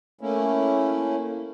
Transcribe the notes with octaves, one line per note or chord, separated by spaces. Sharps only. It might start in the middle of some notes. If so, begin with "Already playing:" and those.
A3 A#3 C#4 E4